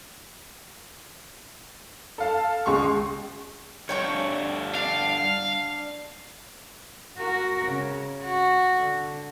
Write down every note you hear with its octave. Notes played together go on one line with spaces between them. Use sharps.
A4 F5 A5
C#2 G#3 C6 C#6
G2 D3 A#4 C#5 G5 C#6
D4 F5
F#4 A#4
C#3
F#4
D3